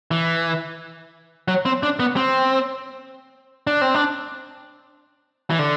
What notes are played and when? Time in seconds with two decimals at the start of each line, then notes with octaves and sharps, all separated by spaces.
0.11 E3
1.48 F#3
1.65 C4
1.83 D4
2.00 B3
2.16 C4
3.67 D4
3.81 C4
3.95 D4
5.50 E3
5.59 D3